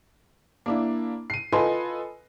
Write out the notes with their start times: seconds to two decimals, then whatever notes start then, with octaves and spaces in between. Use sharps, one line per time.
0.66 A#3 D4 E4
1.30 C7 D#7
1.52 F4 A4 B4 D#5 G#5 C6